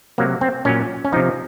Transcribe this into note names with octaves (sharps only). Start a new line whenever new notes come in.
C3 F#3 A#3
C4
A#2 F#3 C#4
C#4
C3 F3 D#4